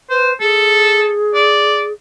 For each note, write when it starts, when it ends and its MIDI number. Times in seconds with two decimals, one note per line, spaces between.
0.10 0.33 71
0.10 0.31 72
0.41 1.93 68
0.41 1.11 69
1.34 1.85 74